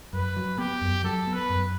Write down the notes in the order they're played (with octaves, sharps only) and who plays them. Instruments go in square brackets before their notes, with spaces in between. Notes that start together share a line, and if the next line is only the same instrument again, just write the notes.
[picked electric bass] F#2 [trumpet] B4
[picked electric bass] F#3
[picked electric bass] B3 [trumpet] G4
[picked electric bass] F#2
[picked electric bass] F#3 [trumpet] A4
[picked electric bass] B3
[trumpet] B4
[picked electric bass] F#2